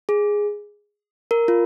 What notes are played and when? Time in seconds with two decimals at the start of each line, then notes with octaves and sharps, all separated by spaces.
0.09 G#4
1.31 A#4
1.48 F4